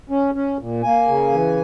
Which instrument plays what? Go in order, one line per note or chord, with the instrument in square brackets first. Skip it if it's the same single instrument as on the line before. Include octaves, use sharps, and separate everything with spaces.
[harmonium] C#4
C#4
A#2
A#3 G#5
C#3
E3